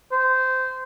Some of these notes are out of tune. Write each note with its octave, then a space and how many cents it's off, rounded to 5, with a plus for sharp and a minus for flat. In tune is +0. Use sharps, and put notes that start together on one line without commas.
C5 -15